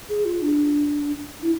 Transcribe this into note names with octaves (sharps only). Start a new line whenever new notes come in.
G#4
F4
D4
E4